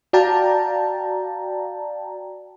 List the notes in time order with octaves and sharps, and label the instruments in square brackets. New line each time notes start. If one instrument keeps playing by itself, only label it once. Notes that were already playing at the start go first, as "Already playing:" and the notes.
[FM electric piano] F#4 D5 F5 G5 A5 A#5